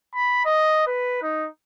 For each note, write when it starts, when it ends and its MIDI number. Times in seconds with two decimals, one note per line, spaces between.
0.15 0.44 83
0.45 0.83 75
0.87 1.21 71
1.22 1.48 63